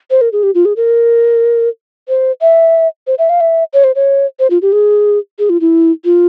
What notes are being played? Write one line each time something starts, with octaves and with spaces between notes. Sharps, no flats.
C5
A#4
G#4
G4
F4
G#4
A#4
C5
E5
C5
E5
F5
E5
C#5
C5
C#5
C5
F4
G4
G#4
G#4
F4
E4
F4